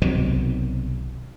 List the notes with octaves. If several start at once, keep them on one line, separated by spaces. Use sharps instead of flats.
B1 C3 D#3 F#3